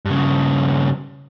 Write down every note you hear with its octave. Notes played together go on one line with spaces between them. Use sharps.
G2 C#3